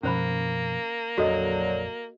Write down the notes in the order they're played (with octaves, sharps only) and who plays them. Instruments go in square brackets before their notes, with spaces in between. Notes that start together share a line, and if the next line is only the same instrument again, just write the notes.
[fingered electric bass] F#2 B2 F3 [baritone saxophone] A#3 [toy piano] C#4 C5 B5
[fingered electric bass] A#1 F2 [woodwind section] D3 F#3 [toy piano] F#4 A4 D#5